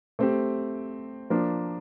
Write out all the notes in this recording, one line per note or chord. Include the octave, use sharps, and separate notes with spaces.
A3 C4 G4
F3 A#3 D4